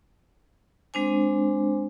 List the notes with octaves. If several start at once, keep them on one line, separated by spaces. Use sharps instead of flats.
G#3 C4 D4 C5 G#5